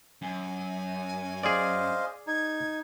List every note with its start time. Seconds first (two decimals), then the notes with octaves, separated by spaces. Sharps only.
0.22 F#2 G#5
1.43 G#4 C5 D5 D#5 F5
2.27 D#4 G#6